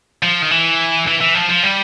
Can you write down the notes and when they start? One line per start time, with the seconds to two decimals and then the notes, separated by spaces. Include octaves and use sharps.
0.23 F3
0.42 D#3
0.51 E3
1.08 E3
1.21 E3
1.35 F3
1.50 F3
1.64 G3